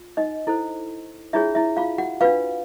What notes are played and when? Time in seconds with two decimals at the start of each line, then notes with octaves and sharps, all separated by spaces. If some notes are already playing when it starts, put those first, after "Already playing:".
Already playing: F4
0.17 D#4 D#5
0.47 E4 A4 C5
1.33 D4 E4 F4 G#4 C#5 E5
1.55 E4 E5
1.77 F4 F5
1.98 F#4 F#5
2.21 D4 F4 F#4 B4 F5